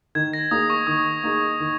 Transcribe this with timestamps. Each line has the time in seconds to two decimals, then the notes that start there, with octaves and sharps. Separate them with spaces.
0.15 D#3 G#6
0.33 A#6
0.51 A#3 D#4 G#4 D#6
0.70 C#6
0.87 D#3 D#6
1.23 A#3 D#4 G#4
1.60 D#3